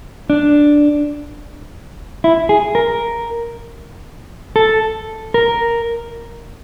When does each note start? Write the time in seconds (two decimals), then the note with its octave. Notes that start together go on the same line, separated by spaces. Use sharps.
0.30 D4
2.24 E4
2.49 G#4
2.75 A#4
4.56 A4
5.34 A#4